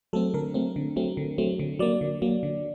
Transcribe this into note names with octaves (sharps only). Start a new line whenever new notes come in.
F#3 A3 C4 A4
D3 A#4
F#3 A3 C4
D3
F#3 A3 C4
D3
F#3 A3 C4
D3
F#3 A#3 D5
D3
F#3 A#3
D3